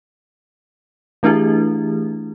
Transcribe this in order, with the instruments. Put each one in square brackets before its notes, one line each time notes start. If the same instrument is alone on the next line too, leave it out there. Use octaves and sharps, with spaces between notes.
[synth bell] E3 A3 D4 E4 G4 G#4